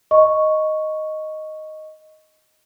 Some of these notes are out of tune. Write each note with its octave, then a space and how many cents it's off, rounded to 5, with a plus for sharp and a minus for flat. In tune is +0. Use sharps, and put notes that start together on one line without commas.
D#5 +0 C#6 +0